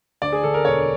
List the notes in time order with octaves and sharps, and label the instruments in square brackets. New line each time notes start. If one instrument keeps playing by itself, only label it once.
[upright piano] D2 D5
G#4
D3 A4
A#4
E1 C#5